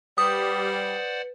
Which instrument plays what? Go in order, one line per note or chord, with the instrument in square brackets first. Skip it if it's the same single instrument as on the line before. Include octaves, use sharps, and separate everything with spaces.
[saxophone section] G3 [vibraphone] B4 [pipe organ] C5 D5 F#5 [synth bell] D#6